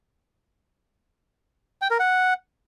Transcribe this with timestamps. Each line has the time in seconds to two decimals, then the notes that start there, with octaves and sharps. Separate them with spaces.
1.82 G5
1.91 A#4
2.00 F#5